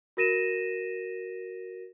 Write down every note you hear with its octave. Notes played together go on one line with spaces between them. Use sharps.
F#4 A#4 A#6 D#7 E7